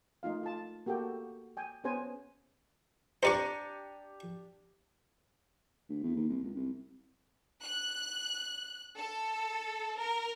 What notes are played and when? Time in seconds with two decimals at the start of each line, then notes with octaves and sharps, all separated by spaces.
0.23 A3 D#4 F4 F5
0.43 F4 A5
0.86 A#3 F#4 G4 A4 G5
1.57 G5 G#5
1.84 B3 C#4 G#4 B4 C5 G#5
3.23 D4 G4 C5 D5 A#5 C#6 C#7 D#7
5.89 D2
6.03 E2
6.15 D#2
6.29 C2
6.43 C#2
6.55 C2
7.63 F#6
8.97 A4
9.98 A#4